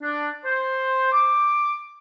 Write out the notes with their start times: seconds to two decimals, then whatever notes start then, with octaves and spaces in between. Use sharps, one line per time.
0.03 D4
0.45 C5
1.13 D6